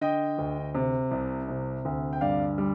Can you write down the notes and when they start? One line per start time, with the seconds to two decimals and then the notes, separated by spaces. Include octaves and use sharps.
0.01 D3 D#5 G5
0.38 D2
0.75 C3
1.11 C2
1.48 C3
1.85 D2
2.13 G5
2.21 G2 D5 F5
2.58 G3